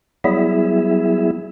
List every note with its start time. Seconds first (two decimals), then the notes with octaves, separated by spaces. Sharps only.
0.24 F#3 G3 B3 E4 G#4 E5